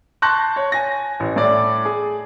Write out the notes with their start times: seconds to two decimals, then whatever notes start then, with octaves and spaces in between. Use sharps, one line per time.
0.22 A5 C6 C#6 F#6 G6 A#6
0.56 C#5
0.72 G#5 A#6
1.20 A1
1.36 A2 D5
1.85 G#4